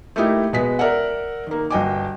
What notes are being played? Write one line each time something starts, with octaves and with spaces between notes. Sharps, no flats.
A3 A#3 D#4 E4 G4
B2 G#3 B3 B6
A#4 D5 E5 F#5
D#3 A#3
G1 F#4 D#5 G5 G#5 D6